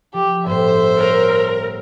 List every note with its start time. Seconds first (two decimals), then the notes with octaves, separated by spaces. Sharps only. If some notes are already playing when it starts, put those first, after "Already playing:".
0.14 F3 G4
0.46 G1 A2 C5 E5
0.98 A#4 C#5